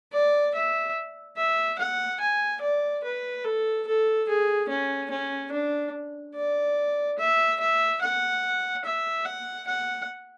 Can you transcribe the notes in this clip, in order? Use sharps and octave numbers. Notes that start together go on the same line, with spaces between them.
D5
E5
E5
F#5
G#5
D5
B4
A4
A4
G#4
C#4
C#4
D4
D5
E5
E5
F#5
E5
F#5
F#5